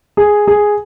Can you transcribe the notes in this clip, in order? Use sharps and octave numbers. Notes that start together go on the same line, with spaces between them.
G#4
G#4